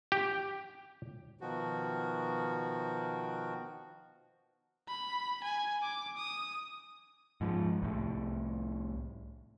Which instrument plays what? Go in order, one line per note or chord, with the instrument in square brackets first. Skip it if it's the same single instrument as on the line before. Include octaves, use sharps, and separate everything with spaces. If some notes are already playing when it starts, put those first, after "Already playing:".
[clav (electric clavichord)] G4
[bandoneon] B2 D#3 F3 F#4
[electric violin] B5
G#5
D6
D#6
[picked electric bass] G#2 F3
C2 A2